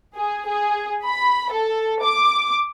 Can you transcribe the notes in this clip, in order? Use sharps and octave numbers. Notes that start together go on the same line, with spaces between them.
G#4
G#4
B5
A4
D6